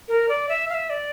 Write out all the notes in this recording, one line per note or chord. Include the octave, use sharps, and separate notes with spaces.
A#4
D5
E5
F5
E5
D5